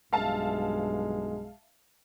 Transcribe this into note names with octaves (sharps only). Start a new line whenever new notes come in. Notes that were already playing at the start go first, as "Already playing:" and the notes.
B1 G2 G#3 E5 F5 A5